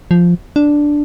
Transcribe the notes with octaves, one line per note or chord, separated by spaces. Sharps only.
F3
D4